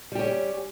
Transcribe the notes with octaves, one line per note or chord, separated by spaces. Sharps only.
G3 C#4 G4